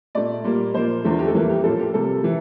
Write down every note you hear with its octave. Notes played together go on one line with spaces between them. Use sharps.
A#2 A3 D5
A#2 G3 A#3
A#2 F3 A#3 C5
E2 D3 F3 A3
G4
A4
F2 E3 G3 A#3 A#4
G4
A2 F3 A#3 A4
G4
C3 G3 A#3 A4
E3